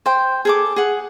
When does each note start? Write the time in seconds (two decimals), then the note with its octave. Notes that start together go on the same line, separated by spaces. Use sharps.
0.06 C5 G5
0.45 G#4 A4 D6
0.76 G#4 F#5